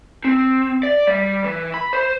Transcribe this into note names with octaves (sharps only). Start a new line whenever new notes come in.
C4
D5
G3
E3
B5
C5